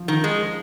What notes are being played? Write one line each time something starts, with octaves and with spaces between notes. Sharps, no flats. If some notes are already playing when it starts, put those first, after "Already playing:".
Already playing: F3
D#3
G#3